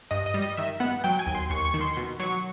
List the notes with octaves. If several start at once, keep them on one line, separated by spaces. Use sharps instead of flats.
G2 D#5
D#5
G3
D#5
D#3 E5
B3 F#5
F#3 G5
G#5
D#2
C6
D#2 C#6
C#6
D#3
C6
B2
F#3 C#6